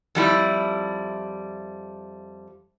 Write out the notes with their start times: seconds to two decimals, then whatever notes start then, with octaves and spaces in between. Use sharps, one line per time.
0.15 F2 G3 E4